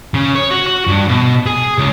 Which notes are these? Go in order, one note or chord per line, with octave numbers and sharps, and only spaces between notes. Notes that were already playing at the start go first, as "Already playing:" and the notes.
C#3
C#5
F#4
F#4
G2
B2
G#4
C#2